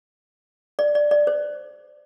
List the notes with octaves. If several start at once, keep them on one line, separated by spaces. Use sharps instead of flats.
D5
D5
D5
C5